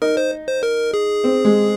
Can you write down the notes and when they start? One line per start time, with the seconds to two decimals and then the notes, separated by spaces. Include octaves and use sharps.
0.02 D#4 A#4
0.17 C5
0.47 C5
0.63 A#4
0.94 G#4
1.24 C4
1.45 G#3